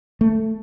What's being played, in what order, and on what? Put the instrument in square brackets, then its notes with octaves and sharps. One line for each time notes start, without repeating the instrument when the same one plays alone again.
[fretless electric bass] A3